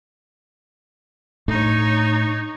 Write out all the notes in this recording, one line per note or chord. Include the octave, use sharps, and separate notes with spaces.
A2 A3 D4 D#4 C#5